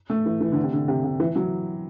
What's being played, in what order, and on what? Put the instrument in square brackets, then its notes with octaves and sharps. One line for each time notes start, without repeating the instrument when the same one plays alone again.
[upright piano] A3
E3
E3
D3
C3
D3
C3
C3
E3
F#3